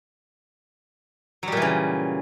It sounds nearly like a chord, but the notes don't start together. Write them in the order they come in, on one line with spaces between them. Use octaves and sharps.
F#3 G3 A#2 E3 C#3